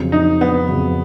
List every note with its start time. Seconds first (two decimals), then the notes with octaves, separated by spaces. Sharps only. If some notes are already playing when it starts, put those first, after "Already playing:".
Already playing: F2 C#3 F#3
0.12 D#4
0.41 B3
0.68 F2 C#3 F#3